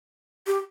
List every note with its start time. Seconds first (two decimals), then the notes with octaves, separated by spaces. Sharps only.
0.47 G4